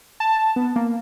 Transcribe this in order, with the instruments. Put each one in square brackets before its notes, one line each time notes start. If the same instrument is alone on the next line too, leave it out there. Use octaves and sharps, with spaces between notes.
[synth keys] A5
B3
A#3